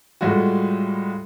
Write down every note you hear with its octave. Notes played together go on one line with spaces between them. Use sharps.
A2 G3 G#3 F4 F#4